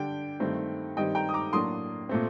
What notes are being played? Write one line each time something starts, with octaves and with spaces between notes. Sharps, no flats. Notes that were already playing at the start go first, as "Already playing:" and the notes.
Already playing: D3 G3 D4 G5
G2 D#3 A3 C4
G2 D#3 G3 C4 D#5 G5
G5 A#5
D#6
A#5 D6
A2 F#3 A#3 D4 C6 D#6
A#2 A3 C4